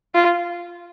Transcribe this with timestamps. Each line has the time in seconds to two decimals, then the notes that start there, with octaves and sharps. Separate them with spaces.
0.14 F4